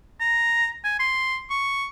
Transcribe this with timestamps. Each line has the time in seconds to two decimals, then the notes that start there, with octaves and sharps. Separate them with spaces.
0.20 A#5
0.84 G#5
0.99 C6
1.50 C#6